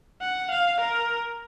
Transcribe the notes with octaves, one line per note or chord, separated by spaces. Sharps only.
F#5
F5
A#4